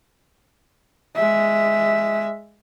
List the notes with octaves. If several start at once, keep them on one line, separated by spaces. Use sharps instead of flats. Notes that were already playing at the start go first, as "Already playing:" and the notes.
G#3 E5